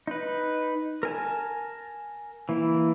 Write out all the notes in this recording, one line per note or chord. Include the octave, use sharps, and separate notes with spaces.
D#4 B4
A#4 G#5 A5
E3 A#3 E4